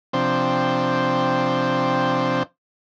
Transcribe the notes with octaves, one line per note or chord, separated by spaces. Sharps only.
C3 F3 C4 D4 C5 G5